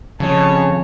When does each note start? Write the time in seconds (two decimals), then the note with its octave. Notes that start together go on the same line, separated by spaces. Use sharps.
0.20 F2 C#3 C#5 A5